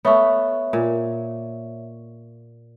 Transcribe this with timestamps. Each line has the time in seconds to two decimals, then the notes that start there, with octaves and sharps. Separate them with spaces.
0.05 A3 B3 C#5 E5 C#6
0.73 A#2